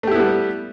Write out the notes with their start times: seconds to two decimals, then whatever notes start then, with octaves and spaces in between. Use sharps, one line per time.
0.03 A3
0.07 G4
0.11 E4
0.15 B3
0.19 G3